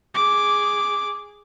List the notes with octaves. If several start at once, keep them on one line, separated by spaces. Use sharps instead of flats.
G#4 D6